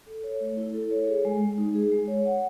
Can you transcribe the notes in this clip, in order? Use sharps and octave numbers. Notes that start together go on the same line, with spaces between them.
A4
C#5
A3
E4
A4
C#5
G#4
G#3
G#3
D#4
G#4
G#3
C#5
F#5